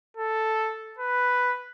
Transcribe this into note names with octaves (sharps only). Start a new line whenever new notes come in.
A4
B4